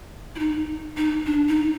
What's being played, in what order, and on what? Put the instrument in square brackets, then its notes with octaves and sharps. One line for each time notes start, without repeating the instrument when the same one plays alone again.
[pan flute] E4
D#4
D#4
D4
D#4